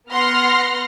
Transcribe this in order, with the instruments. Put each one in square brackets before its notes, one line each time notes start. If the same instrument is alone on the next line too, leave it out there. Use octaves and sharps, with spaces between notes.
[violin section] B3 F#5 C6 F6 A#6